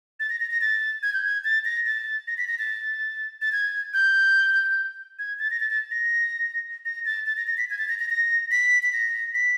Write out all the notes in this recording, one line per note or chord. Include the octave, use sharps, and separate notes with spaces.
A6
A#6
A#6
A#6
A6
G#6
G6
G#6
A6
A#6
A6
A#6
B6
A#6
A6
A6
G#6
G6
G#6
A6
A#6
A6
A6
A#6
A#6
A6
A6
A#6
A#6
B6
G#6
A6
A#6
A#6
A#6
B6
B6
A#6
B6